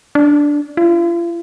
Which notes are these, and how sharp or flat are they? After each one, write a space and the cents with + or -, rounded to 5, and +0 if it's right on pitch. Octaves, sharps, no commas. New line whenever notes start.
D4 -5
F4 -40